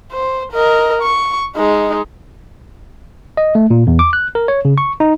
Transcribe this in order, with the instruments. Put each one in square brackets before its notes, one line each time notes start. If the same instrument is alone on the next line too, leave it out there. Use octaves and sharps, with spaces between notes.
[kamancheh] C5
A#4 D#5
C#6
G#3 D#4
[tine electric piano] D#5
A3
A#2
E2
D6
F#6
A#4
C#5
C#3
C#6
D#4